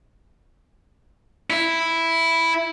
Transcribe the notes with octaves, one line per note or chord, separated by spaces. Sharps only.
E4